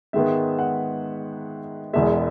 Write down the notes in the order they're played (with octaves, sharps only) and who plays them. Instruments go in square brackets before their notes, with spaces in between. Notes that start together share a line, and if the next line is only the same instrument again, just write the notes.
[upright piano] G#2 D#3 G#3 B3 E5
F#5
E1 E2 B2 G#3 E5